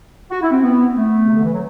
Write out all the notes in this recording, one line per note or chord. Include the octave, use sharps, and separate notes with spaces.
F#4
E4
C4
B3
A3
C3
D3
E3
F#3